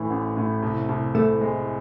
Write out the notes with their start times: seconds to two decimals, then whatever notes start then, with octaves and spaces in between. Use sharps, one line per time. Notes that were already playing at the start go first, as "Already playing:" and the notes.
Already playing: A2 E3
0.10 A1
0.37 A2
0.63 C2
0.89 C2
1.15 C3 A3
1.41 G#3